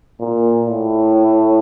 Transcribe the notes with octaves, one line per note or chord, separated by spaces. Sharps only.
A#2
A2